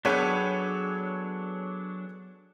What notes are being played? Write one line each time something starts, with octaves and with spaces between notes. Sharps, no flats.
F#3 B3 D4 G#4 A4 C#5 G5 D#7